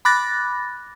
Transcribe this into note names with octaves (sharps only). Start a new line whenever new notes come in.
B5 D6 F#6 A6 A#6